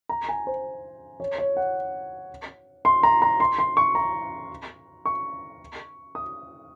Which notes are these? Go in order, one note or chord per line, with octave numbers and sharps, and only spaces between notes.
A#5
G#5
C5
C#5
C#5
F#5
C6
A#5
A#5
C6
C6
C#6
A#5
C#6
D#6